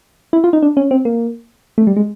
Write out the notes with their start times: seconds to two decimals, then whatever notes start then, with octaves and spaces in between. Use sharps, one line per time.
0.33 E4
0.44 F4
0.53 D#4
0.62 D4
0.77 C#4
0.91 C4
1.05 A#3
1.78 A3
1.87 G3
1.96 G#3